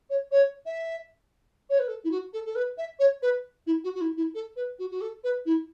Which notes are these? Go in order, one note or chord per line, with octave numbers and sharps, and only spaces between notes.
C#5
C#5
E5
C#5
B4
A4
E4
F#4
A4
A4
B4
E5
C#5
B4
E4
F#4
F#4
E4
E4
A4
B4
F#4
F#4
A4
B4
E4